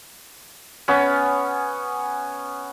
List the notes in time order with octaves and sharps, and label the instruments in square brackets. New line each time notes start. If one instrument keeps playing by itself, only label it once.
[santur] B3 C#4